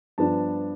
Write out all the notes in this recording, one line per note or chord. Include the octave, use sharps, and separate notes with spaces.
G2 F3 B3 D4 A5